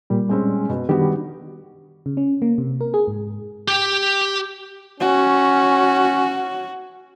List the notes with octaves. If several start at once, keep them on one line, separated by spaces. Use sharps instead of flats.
A#2 G3
G#3 C4 C#4
B2
D#3 G3 B3 D4 F#4 G4
C#3
C#4
A#3
C3
A#4
G#4
G#2
G4 G5
C#4 F#4